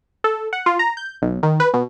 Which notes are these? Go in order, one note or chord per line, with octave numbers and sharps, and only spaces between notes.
A4
F#5
F4
A#5
G6
B1
D#3
B4
B2